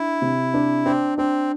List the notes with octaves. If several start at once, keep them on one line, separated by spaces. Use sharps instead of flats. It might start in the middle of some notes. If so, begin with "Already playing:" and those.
Already playing: D4 E4
C3
D4
C4 D4
C4 D4